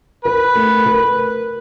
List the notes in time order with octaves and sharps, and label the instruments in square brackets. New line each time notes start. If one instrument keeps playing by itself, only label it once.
[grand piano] A#4 [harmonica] B4
[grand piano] A3
A#4